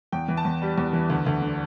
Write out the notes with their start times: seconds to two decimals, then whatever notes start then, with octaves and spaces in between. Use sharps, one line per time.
0.12 E2 G5
0.28 E3
0.37 A5
0.45 E2
0.62 G3
0.78 E2
0.93 E3
1.10 D2
1.26 D2
1.42 D3